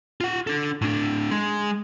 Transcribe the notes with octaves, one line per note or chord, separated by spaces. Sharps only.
F4 F#5
D4 A4
A2 D4
G#3